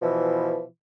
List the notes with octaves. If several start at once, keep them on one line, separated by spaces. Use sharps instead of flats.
B2 E3 F3